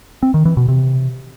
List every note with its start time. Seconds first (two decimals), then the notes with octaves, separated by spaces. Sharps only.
0.23 C4
0.34 D#3
0.45 E3
0.57 B2
0.68 C3